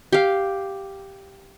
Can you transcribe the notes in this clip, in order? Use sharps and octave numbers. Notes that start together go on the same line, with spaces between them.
G4 F5